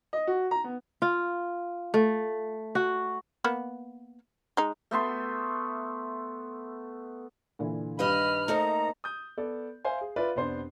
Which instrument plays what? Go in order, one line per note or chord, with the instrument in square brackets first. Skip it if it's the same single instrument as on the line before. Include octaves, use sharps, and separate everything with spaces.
[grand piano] D#5
F#4
A#5
B3
[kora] F4
A3
F#4
[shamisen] A#3 B3 B4
G#3 D#4
[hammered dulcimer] A3 B3 E5 C6
[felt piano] A#2 D3 E3
[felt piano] G2 G4 F5 [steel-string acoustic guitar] D#3 B4 D#5 [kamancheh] B5 F6
[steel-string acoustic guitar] A3 A#3 D#4 [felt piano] A4 C5 [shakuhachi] D#5 [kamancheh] A#5
[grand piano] D#6 G6
B3 A4 D5
C5 E5 F5 G#5
G#4
F4 B4 D5 E5
F1 B3 D4 C5 C6